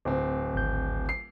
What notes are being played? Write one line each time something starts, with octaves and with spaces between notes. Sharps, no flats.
D1 C4
G#1 G6
C7